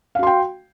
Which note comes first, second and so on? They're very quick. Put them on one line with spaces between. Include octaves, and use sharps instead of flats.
F5 F#4 C6 G5